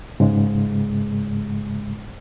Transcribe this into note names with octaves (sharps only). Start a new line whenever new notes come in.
G#2 C#3 G#3